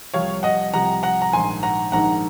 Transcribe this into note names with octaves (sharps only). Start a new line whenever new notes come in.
C2 C3 F3 C#5 F5
D#5 F#5
C2 C3 F3 F#5 A#5
F#5 A#5
A#5
A#1 G#2 D#3 G#5 C6
F#5 A#5
A#1 G#2 D#3 F#5 A#5